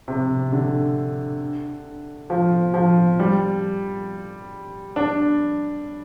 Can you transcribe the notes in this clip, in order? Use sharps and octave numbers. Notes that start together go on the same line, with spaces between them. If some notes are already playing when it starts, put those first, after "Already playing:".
C3
D3
F3
F3
G3
D4